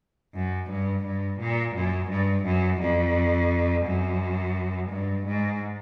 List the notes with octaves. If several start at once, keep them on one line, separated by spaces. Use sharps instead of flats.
F#2
G2
G2
A#2
F#2
G2
F#2
F2
F#2
G2
G#2